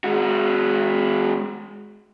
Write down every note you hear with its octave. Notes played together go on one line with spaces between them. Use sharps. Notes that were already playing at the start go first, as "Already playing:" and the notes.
G#3 F#4